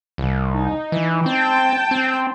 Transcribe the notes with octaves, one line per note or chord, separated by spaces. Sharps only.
C2
D#4
E3
C4 G5 A5
C4